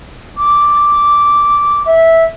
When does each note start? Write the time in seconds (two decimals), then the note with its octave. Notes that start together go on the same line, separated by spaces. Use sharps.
0.38 D6
1.86 E5